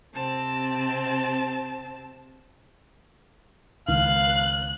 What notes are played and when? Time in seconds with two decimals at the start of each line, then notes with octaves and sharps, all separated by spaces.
0.15 C3 C4 A5
3.88 C#2 D#3 F5 F#6